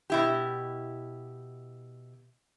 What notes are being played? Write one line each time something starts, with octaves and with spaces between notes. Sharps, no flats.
B2 E4 G4